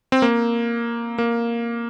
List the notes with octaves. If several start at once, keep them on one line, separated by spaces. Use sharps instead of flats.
C4
A#3
A#3